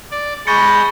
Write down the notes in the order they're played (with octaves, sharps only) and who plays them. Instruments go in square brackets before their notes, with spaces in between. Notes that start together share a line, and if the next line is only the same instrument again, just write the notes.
[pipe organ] D5
[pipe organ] G#3 G6 A#6 [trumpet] B5 [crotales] C#6 A6 C#7